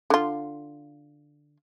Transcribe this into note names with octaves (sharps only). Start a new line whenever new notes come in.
D3 F4